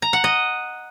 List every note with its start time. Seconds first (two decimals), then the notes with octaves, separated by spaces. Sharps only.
0.02 A#5
0.13 F#5
0.24 D#5